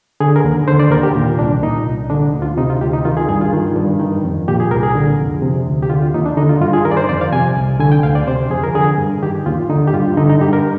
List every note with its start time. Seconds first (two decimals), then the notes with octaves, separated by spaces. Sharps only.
0.20 D3 G#4
0.36 A#4
0.44 D#2
0.68 D3 C5
0.80 D5
0.91 D#2 A#4
1.03 G4
1.15 A#2
1.39 C2 D4
1.63 A#2 D#4
1.87 C2
2.10 D3 D4
2.34 D2
2.42 F4
2.57 C3 D#4
2.70 F4
2.81 D2 G4
2.93 D#4
3.05 D#3 F4
3.17 G#4
3.29 G2 G#4
3.41 F4
3.53 D#3
3.76 G2
4.00 D#3
4.24 F2
4.48 A#2 G4
4.60 G#4
4.71 C2 A#4
4.83 G#4
4.95 D3
5.19 F2
5.42 C3
5.67 D2
5.83 G4
5.90 D3 F4
6.02 F4
6.14 D#2 D#4
6.26 D4
6.37 D3 D#4
6.49 F4
6.61 G2 F4
6.73 G#4
6.85 D#3 A#4
6.91 D5
6.97 C5
7.09 F2 D5
7.21 F5
7.33 C3 G#5
7.57 C2
7.80 D3 G#5
7.92 G5
8.03 D2 F5
8.15 D5
8.27 C3 C5
8.51 F2 G#4
8.64 A#4
8.75 D3 G#4
8.98 G2
9.22 D#3 G4
9.46 D#2 F4
9.70 D3 D#4
9.87 G4
9.93 G2 F4
10.17 D3 D#4
10.29 D#4
10.41 G2 G4
10.53 A#4